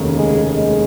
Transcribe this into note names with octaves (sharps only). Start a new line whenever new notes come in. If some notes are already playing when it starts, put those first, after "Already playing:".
Already playing: F1 D#2 C#3 A#3
G#3
G#3